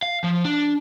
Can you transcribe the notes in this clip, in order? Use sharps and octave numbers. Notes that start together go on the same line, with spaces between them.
F5
F3
D4